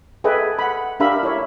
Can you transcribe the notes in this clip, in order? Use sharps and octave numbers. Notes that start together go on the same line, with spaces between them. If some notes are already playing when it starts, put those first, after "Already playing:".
G#4 A4 B4 D#5 E5 G5
F#5 B5
D4 G4 A#4 E5 F5 B5
E4 C#5 E5